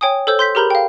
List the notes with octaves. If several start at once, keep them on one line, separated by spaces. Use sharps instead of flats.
C#5 G5 G#5 D#6
A4 C5 C#5 E6 G6
C6 G6 B6
G4 G#4 A#4 A#5 B5 G6
F5 G5